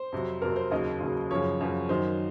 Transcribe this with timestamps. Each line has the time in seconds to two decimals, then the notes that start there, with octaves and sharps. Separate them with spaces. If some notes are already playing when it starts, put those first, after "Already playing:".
Already playing: C5
0.12 F2 C3 F#3
0.42 F2 C3 F#3 A#4
0.56 C5
0.71 D#2 C#3 F#3 D#5
1.00 D#2 C#3 F#3
1.31 F#2 C#3 F3 C#5
1.61 F#2 C#3 F3
1.89 F#2 D#3 F#3 C5